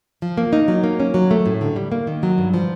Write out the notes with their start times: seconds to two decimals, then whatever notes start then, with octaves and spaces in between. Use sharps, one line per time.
0.22 F3
0.38 A#3
0.53 D#4
0.68 F#3
0.84 A#3
1.00 C#4
1.14 F#3
1.31 A3
1.46 A2
1.61 D3
1.76 G3
1.92 A#3
2.07 D#3
2.23 F#3
2.38 G2
2.54 F3